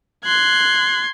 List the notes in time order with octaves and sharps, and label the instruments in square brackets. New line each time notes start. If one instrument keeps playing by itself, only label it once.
[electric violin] C6 G#6 [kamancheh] F#6